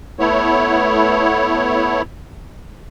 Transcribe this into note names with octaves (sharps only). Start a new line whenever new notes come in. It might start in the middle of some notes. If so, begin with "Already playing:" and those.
A3 B3 E4 C#5